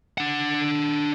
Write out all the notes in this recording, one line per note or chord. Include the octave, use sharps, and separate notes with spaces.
D4 F#5